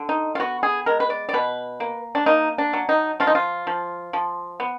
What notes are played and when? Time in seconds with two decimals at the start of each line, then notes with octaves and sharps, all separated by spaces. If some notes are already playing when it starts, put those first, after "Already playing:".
Already playing: D3
0.09 D#4
0.35 F4
0.40 B3 F#4
0.63 G#4
0.86 G#3 A#4
1.00 B4
1.10 D5
1.29 D5
1.33 B2 B4
1.80 A#3
2.15 D4
2.26 A#3 D#4
2.58 D4
2.73 F#3
2.89 D#4
3.20 F3 F4
3.27 D#4
3.35 F4
3.67 F3
4.13 F3
4.60 B3